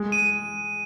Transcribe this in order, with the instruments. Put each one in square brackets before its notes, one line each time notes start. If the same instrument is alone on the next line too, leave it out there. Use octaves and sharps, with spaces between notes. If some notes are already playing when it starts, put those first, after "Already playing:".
Already playing: [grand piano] G#3
[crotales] D#7